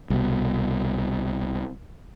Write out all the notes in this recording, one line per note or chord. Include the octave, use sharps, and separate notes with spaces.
C2 B2